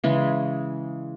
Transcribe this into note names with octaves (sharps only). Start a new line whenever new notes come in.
C#3 E3 G#3